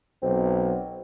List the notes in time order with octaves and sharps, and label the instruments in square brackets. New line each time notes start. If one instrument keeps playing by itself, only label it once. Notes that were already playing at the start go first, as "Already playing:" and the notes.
[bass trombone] B1 [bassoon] C4